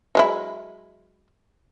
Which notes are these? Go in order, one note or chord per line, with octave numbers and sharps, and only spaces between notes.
F#3 G#3 E4